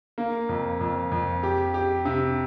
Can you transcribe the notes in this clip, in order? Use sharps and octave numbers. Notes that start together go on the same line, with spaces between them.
A#3
F2
F2
F2
G4
G4
C3